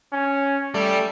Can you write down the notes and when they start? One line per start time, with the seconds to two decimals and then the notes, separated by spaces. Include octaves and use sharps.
0.13 C#4
0.74 G3 A3